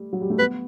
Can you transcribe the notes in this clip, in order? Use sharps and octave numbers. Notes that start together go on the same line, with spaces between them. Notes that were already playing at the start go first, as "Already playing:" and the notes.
Already playing: G3 A3
F#3
G3
A3
B3 B4